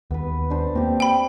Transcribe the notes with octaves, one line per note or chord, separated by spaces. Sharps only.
D#2 B3 B4
D4 C5
A#3 C4 G4
G5 B5